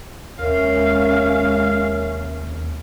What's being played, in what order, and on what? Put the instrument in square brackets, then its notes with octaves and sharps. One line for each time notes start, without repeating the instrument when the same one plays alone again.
[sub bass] D#2 [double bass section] C3 G#3 C#4 [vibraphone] A#4 C#5 E5 [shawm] F5